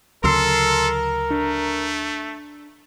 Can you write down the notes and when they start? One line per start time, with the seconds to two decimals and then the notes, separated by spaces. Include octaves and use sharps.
0.24 D2 C#3 F#3 A4 A#4 C6 E6 C7
1.31 A3 D4